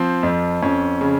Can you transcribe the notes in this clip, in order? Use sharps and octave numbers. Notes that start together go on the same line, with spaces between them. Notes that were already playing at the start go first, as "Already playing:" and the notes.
Already playing: F3 C4
F2
F2 C#4
C#3